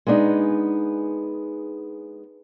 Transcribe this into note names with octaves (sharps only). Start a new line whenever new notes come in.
G#3 B3 D4 D#4 G#4